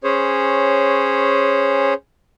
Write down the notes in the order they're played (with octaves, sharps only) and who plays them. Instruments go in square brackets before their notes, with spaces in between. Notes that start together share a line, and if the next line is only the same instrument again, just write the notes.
[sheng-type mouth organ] C#4 G#4 C5 C#5